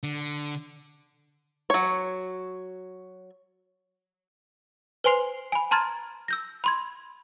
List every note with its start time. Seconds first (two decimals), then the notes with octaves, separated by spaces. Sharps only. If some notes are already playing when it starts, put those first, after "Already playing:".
0.03 D3
1.70 F#3 C#5
5.04 B4 C5 G#5 C6 C7 F7
5.52 G#5 B5
5.71 A5 A#5 C6 F6 G#6 A6
6.28 E6 G6 A#6
6.64 B5 C6 G#6